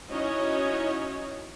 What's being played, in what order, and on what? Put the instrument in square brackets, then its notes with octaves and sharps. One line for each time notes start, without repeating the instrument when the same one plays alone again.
[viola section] C#4 D#4 E4 F#4 C#5 D#5